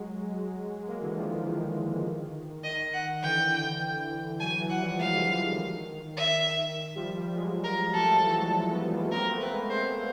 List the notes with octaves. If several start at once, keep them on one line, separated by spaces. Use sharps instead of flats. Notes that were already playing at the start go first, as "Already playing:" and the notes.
Already playing: F#3 G#3
G#3 A#3
D3 E3
D#3 F3
D#3
D#3
D#3 D#5
F#5
D3 E3 G5
E3 F#3 G#5
E3 F#3
F#5
F3 G3
F#3 G#3 F5
D3 E3
D3
D#3
E5
F3 G3
F3 G3
F#3 G#3
A#4
G3 A3 A4
F3 G3
E3 F#3
F#3 G#3
A3 B3
A3
G#3 A#3
A#3 C4 A#4
A3 B3
B4
G#3 A#3
C5